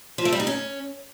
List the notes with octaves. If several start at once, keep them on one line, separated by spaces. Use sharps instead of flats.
F3
A3
G3
D#4
C#4